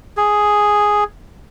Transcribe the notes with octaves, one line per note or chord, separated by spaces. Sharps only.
G#4